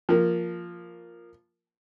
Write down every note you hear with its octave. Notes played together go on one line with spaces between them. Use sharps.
F3 A#3